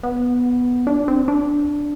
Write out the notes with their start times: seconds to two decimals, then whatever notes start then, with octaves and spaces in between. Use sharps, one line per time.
0.03 B3
0.87 D4
1.08 C4
1.28 D4